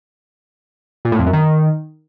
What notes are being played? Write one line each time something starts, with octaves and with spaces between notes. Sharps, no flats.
A#2
A2
F2
F#2
D#3